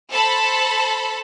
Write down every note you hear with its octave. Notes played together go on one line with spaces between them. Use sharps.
A4 C5 A5 B5